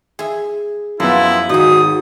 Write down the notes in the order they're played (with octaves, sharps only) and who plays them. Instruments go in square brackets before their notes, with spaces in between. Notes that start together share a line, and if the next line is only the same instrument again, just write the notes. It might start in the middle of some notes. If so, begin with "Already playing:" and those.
[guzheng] G#4 E5
[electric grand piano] F#2 B3 [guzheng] F3 [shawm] E4
[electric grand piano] G#1 [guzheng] D#4 G#4 [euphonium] F#4 [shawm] D#6